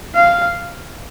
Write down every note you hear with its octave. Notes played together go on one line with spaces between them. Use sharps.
F5